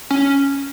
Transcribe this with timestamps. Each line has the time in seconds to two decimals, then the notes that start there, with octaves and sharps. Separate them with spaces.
0.11 C#4